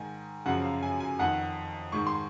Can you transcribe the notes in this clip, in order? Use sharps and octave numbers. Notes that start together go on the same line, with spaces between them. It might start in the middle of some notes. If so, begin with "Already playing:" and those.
Already playing: G#2 D#3 G#5
F#2 C#3 F3 F#5
F5
G#5
G#5
F2 D#3 F#5
G#2 D#3 C#6
C6